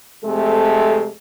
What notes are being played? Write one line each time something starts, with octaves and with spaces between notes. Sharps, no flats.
F2 C3 G#3 A3 A4